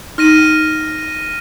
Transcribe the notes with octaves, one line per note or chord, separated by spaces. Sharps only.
D#4 F6 A#6 D#7